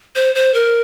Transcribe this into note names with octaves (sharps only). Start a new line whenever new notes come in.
C5
C5
A#4